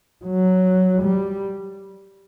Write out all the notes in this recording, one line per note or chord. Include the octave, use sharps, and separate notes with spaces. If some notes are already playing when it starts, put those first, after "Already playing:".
F#3
G3